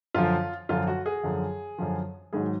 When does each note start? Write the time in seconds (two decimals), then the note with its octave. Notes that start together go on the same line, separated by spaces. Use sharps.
0.15 F#2 D3 F3 F4
0.69 F#2 D3 F3 F4
0.87 F#4
1.06 G#4
1.23 F#2 D3 F3
1.78 F#2 D3 F3
2.33 G#2 D#3 F#3 G#4